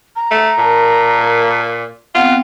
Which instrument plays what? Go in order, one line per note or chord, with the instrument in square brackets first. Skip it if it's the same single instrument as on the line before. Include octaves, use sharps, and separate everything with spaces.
[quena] A#5
[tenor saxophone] A3
[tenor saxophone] A#2 [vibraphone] A#4 A5
[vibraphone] B3 C4 G5 [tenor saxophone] F4 [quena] F#5